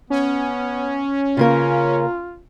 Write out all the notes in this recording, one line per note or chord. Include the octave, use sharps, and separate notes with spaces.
B3 C#4
C#3 A#3 F4 A#4